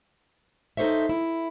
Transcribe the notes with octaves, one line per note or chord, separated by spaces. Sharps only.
D#4 A4 C5 C#5 E5
E4